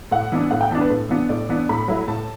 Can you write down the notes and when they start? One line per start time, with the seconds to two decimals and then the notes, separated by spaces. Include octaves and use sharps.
0.11 A2 F#5
0.32 E3 B3 D4
0.51 A2 F#5
0.61 G5
0.71 E3 B3 D4 A5
0.81 B4
0.90 A2
1.09 E3 B3 D4
1.29 A2 D5
1.49 E3 B3 D4
1.69 A2 B5
1.88 F#3 A3 E4
2.08 A2 A5